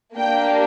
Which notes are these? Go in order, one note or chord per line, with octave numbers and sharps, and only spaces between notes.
A#3 D4 G4 G5